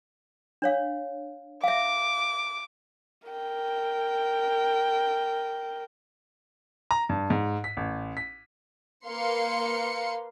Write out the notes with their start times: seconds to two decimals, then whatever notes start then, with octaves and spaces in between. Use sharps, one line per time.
0.62 D4 C#5 F5
1.64 E5 F5 D6
3.28 A#4 G5
6.91 A#5
7.09 G2
7.30 G#2
7.64 B6
7.77 A1
8.17 B6
9.07 A#3 B4 F5 C6 C#7